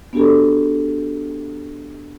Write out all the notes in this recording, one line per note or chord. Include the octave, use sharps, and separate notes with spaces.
B3 D4 F#4 G4 A4